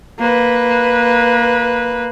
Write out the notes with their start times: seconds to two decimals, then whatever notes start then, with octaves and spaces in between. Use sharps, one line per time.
0.19 A#3 B4